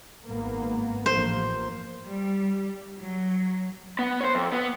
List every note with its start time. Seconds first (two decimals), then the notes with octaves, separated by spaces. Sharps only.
0.24 G#1 A#3 B3
1.06 A1 F3 A#3 C5
2.06 G3
2.99 F#3
3.99 B3
4.21 C5 C#5
4.35 F2
4.53 B3